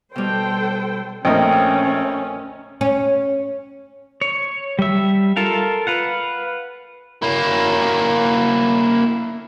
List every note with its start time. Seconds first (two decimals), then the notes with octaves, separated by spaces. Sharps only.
0.16 B2 G3 A4 C5 G5
1.25 A#1 A3 C4 C#4 A#4 D#5 G5
2.81 C#4
4.21 C#5
4.79 G3 E5
5.37 F4 A4 A#4 F5
5.87 B4 F5 F#5
7.22 A#3 E4